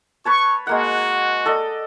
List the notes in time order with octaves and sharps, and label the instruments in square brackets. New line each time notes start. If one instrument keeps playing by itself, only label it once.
[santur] B4 C#5 A5 [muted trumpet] C#6
[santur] G#3 A#3 F#5 [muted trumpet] F#4
[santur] A4 D5 D#5